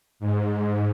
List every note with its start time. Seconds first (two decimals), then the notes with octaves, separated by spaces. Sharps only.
0.20 G#2